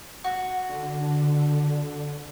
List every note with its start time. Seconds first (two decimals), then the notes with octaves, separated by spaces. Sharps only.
0.24 F#4
0.66 D3